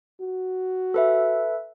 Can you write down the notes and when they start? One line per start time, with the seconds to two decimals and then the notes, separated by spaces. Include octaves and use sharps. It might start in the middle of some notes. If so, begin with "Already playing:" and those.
0.21 F#4
0.94 A4 B4 E5